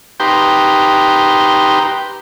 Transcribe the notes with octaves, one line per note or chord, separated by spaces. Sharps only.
D#4 G4 B4 G5 A#5 C6